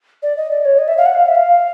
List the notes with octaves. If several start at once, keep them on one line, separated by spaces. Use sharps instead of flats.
D5
D#5
D5
C#5
D#5
E5
F5
F#5
F5
E5
F5